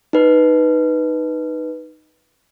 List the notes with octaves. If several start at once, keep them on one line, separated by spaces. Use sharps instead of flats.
D#4 B4